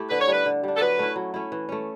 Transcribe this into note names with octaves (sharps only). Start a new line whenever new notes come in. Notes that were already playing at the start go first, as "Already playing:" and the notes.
Already playing: A3 E4 G4
D3 B4
C#5
G3 D4 B4
D3
G3 D4
A4
F#3 B4
A3 C#4 E4
F#3
A3 C#4 E4
E3
A3 C#4